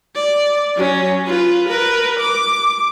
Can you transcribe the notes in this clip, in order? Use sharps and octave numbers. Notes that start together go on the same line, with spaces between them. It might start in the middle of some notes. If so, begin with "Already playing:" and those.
D5
F#3 C#4
F4 B4
A#4 B4
D6